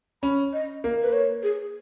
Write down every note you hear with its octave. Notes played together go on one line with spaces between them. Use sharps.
C#4 B5
D#5
A#3
B4
C#5
G#4